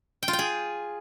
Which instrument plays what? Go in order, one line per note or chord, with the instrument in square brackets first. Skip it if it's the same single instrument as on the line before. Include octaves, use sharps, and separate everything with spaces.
[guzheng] G5
F4
G5
G#4